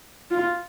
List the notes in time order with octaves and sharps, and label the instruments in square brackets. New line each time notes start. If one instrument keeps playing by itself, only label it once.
[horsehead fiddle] F4